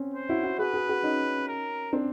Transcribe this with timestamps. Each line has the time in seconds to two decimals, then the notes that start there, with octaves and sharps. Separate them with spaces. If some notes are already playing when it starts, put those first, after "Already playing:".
Already playing: C4 C#4
0.14 C5
0.29 E4 F#4
0.43 E4 F#4
0.58 F#4 G#4 B4
0.74 F#4 G#4
0.89 F#4 G#4
1.03 C#4 D#4
1.48 A#4
1.93 C4 D4